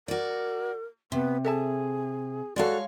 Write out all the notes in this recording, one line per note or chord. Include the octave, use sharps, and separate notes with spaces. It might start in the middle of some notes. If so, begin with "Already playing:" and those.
F#4 A#4 D5
C3 B3
G#4 A4 E5 A5
G#3 F#4 A4 C#5 D5 F5